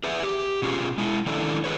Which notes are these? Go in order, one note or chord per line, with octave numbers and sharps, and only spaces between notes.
G#4 B4 E5
G4
B2 C#4 F4 F#4 G#4
G#3 E4
D#3 A3 C#4 D4 E4 A4
G#4 B4 C#5